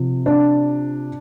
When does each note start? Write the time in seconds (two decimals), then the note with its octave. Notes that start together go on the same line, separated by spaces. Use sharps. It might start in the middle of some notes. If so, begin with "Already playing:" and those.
Already playing: C3 F3
0.26 D4